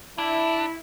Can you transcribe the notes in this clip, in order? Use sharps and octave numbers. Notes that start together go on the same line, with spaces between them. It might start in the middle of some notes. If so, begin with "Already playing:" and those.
D4 E4